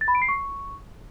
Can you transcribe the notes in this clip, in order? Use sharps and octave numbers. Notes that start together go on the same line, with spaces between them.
A6
B5
D7
C7
C#6